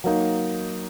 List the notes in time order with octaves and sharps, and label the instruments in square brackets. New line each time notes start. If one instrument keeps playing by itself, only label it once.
[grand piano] F#3 A#3 D#4